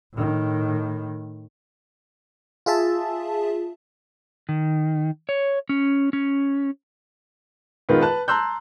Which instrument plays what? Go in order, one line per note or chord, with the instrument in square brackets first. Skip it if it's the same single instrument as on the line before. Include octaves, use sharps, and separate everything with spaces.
[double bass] A2 D#3
[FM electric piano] F4 G#4 E5 A5
[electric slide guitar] D#3
C#5
C#4
C#4
[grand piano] D#3 G#3 B3 F4
B4 A5 F#6
A5 A#5 C6 E6 F#6 G6